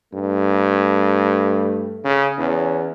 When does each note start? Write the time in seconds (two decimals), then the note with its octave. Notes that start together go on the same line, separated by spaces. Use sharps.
0.14 G2 A3
2.05 C#3
2.39 E2 C#4